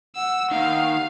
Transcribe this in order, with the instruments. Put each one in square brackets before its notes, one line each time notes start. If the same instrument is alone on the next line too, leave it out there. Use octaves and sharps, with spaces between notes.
[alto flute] F#5 [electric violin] E6
[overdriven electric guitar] D#2 D#3 [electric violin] F5